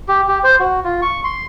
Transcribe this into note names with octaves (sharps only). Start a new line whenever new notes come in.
G4
G4
C5
F#4
F4
C#6
C6